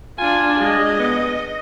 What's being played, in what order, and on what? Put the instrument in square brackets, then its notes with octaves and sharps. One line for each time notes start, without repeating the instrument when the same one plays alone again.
[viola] D4 F4 [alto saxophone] G#5
[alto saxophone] G#3 [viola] D#5
[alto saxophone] B3